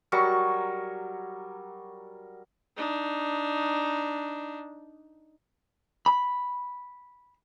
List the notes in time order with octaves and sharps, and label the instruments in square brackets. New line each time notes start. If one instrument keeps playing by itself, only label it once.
[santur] F#3 G3 A#4 C#6
[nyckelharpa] D4 D#4
[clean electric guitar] B5